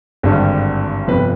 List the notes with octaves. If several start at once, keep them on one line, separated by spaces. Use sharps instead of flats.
G#1 G2 D3 G3
G1 F2 C3 B4